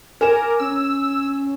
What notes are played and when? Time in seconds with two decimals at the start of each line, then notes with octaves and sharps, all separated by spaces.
0.21 A#4 G#5 D6 E7
0.60 C#4 E6